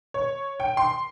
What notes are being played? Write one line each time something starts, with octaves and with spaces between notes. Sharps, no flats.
C#5
G5
C6